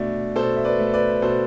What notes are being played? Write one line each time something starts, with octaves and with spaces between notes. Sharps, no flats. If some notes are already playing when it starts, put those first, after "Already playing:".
Already playing: B2 A3 D4
B2 A4 C5
E5
B4 D5
A3
B4 D5
B2 A4 C5